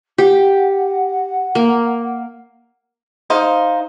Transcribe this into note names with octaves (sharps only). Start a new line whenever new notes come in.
G4 F#5
A#3
D#4 C5 F5